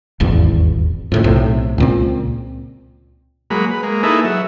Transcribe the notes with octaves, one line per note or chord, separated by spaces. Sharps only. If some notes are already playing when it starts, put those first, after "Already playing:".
D#1 G#1 E2
F2 A2 C#3
B1 A2 C3
C#2 A#2 C4
F#3 G#3 A#3 B5
B4
G#3 A#3
A#3 D#4 E4 G#4 A4 B4
F#3 E5